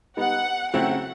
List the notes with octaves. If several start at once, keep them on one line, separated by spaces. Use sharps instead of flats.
G3 B3 D#4 F#5
C#3 F#3 A3 C4 E4 F#5